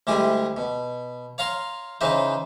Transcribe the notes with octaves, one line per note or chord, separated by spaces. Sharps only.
D2 G3 G#3 E4 G#4 G#5
B2
C#5 F5 A#5 C6 C#6
C#3 E3 D#4 B4 C5